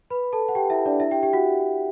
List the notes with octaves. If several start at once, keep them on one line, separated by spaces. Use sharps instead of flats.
B4 B5
A4 A5
F#5
G4 G5
E4 E5
D4 D5
E4 E5
G4 G5
G4 G5
F#4 F#5